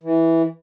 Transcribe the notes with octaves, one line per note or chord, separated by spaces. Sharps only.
E3